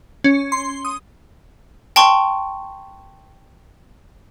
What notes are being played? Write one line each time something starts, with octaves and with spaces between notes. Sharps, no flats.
C#4
C6
D#6
G5 A5 C6 C#6